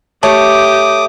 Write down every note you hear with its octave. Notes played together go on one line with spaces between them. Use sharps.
A3 G4 C#5 A5 D6 D#6